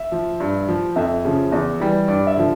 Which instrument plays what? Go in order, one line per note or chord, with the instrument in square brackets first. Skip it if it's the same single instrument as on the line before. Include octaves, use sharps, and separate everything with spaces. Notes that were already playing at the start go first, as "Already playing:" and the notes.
Already playing: [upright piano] E5
F3
G2
F3
F2 E5
C#3 F3
E2
E3 G3
G2 D5
E5
D3 F3